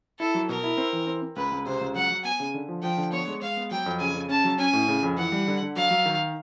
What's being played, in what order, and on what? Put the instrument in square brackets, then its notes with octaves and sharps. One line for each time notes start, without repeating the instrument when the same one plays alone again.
[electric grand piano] E4 [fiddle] A4
[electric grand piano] F#3
[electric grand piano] B2 [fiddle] A#4
[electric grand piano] E4
C4
E3
C4
C4
[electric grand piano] C#2 [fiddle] B4
[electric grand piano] C#2
[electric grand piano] C3 [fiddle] C5
[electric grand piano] C#2
[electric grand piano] F#3 [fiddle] F#5
[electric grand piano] F#3
[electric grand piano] B3 [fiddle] G#5
[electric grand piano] C#3
D3
F3
[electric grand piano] F3 [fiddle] G5
[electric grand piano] D3
[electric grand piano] B3 [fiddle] C#5
[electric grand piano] G#3
[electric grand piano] G#3 [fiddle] F5
[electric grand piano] B3
[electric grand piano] F#3 [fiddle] G5
[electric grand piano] F2
[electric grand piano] C#3 [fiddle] G#5
[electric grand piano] C#3
[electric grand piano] C#4 [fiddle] A5
[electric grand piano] F#3
[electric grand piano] C#4 [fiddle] G#5
[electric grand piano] A2
C#3
F2
[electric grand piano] E3 [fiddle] F#5
[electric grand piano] G3
D3
D3
[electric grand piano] F#3 [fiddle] F5
[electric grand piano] F#3
D#3